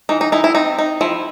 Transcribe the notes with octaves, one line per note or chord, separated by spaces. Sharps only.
E3 D#4
D#4
D#4 E4
E4
C4 D#4
D#4
F3 E4